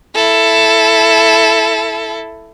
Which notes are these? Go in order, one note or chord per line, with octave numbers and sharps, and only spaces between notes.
E4 A4